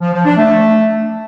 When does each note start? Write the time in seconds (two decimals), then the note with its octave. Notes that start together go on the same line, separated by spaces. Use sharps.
0.01 F3
0.13 F3
0.25 D4
0.37 A3